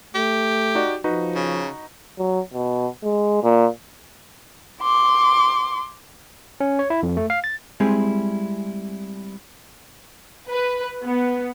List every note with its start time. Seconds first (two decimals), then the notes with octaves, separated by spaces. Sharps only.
0.15 A3 G4
0.75 D#4 F#4 D5
1.04 F3 D#4 F#4 B4
1.35 C#3
2.18 F#3
2.53 B2
3.03 G#3
3.43 A#2
4.82 C6 D6
6.60 C#4
6.79 C#5
6.90 E4
7.03 F2
7.17 A3
7.30 F5
7.44 A6
7.80 G3 G#3 C4 E4 G#4
10.48 B4
11.06 B3